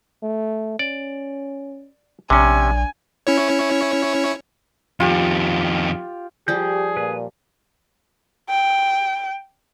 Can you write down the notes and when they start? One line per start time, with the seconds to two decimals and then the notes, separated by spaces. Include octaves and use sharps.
0.23 A3
0.79 C#4 D5
2.30 A#1 C3 C#4 D4 G#5
3.27 C#4 E4 C#5
5.00 F2 D#3 F4 G4
6.48 F3 G3 G4 G#4 G6
6.97 A#2 B4
8.50 G5